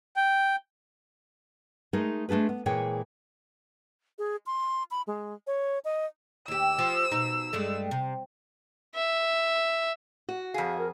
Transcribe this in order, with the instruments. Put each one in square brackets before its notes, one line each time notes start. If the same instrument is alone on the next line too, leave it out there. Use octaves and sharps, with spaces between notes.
[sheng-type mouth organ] G5
[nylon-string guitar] G#3 A3 D#4 G#4 A#4
G#3 A3 D4 G#4 B4
B3
A#2 E3 G#3 G#4 C#5 G5
[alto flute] G#4
C6
B5
G#3
C#5
D#5
[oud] D#2 G4 [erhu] E6
[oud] F3
B2 D#4
G2 G#3 A3
C3
[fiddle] E5
[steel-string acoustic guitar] F#4
[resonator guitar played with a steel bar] F2 G#4 [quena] F5
[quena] A#4